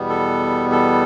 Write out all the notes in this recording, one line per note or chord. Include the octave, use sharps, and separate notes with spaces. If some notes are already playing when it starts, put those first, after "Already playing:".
Already playing: E2 B2 G3 B3
A4
A4